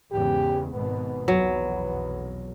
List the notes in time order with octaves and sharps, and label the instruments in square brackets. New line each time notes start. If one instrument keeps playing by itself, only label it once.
[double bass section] E2 G#2 C#3 [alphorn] G4
[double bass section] G#1 G#2 B2 [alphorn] B3
[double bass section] F1 B1 E2 [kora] F#3